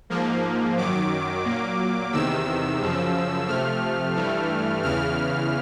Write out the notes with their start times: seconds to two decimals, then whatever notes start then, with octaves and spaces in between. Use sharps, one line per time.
0.10 G#2 F3 A#3
0.77 F#2 D#3 F#3 D6
1.45 A#2 F#3 A#3
2.12 E2 C3 D#3 E6
2.80 F#2 C#3 F3
3.48 C3 F3 A3 F6
4.15 G2 E3 A3
4.83 E2 C#3 E3 F6